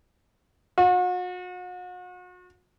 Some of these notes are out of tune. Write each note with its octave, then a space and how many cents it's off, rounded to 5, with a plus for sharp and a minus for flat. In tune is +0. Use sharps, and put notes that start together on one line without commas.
F#4 -40